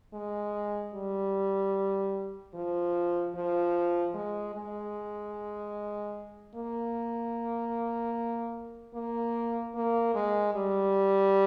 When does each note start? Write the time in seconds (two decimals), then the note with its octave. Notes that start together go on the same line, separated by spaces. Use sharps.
0.14 G#3
0.94 G3
2.55 F3
3.35 F3
4.14 G#3
4.54 G#3
6.55 A#3
8.95 A#3
9.75 A#3
10.15 G#3
10.55 G3